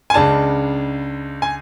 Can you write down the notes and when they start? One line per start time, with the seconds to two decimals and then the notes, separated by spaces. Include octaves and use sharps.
0.10 G#5
0.14 C#2 C#3 G#3 D4 A5
1.42 G#5